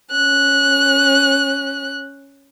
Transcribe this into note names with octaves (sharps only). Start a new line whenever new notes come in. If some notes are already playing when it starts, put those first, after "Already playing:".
C#4 F#6